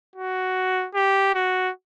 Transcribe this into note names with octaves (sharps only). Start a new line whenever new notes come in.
F#4
G4
F#4